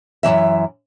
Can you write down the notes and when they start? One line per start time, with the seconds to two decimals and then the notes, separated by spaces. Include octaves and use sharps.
0.23 F#2 C#3 E3 E5